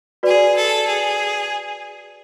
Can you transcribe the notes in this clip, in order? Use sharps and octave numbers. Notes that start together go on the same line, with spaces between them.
F#4 G#4 B4 D5
A4
G#4